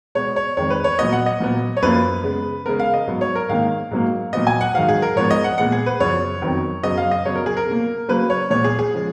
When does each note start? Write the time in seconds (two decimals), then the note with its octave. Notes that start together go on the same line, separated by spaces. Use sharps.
0.15 B2 G#3 B3 C#5
0.36 C#5
0.57 F2 D#3 G#3 C#5
0.70 B4
0.84 C#5
0.99 A#2 F#3 B3 D#5
1.12 F#5
1.26 D#5
1.40 A#2 F#3 B3
1.77 C#5
1.82 F#2 F3 A#3 B4
2.24 C#3 G#3 B3
2.66 C#3 G#3 B3 A#4
2.79 F5
2.94 D#5
3.07 G#2 F#3 B3
3.21 C#5
3.35 A#4
3.49 G#2 D#3 A#3 F5
3.91 G#2 F#3 A#3
4.33 A#2 F#3 B3 D#5
4.47 G#5
4.61 F#5
4.74 G#2 D#3 F#3 F5
4.89 G#4
5.02 A#4
5.16 G#2 F3 G#3 B3 C#5
5.31 D#5
5.44 F#5
5.58 A#2 G#3 B3 F#5
5.72 G#4
5.86 B4
6.00 F#2 C#3 F3 B3 C#5
6.42 F2 D#3 F#3 B3
6.83 F#2 C#3 F#3 B3 D#5
6.98 F5
7.11 D#5
7.25 C#3 F#3 B3 C#5
7.36 A#4
7.46 G#4
7.57 A#4
7.66 B2 A#3
8.09 C#3 F#3 A#3 B4
8.30 C#5
8.50 A#2 G#3 B3 C#5
8.64 G#4
8.79 G#4
8.94 C#3 F3 G#3